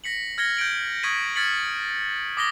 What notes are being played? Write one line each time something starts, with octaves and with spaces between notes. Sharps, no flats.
A#6 B6 C#7 F#7
F6 G#6 A#6 C#7 G7
G6 G#6 D7 F#7
C#6 D#6 G#6 B6 D#7 F#7
F6 G#6 A6 B6 C#7 F#7
D6 D#6 A#6 B6 G7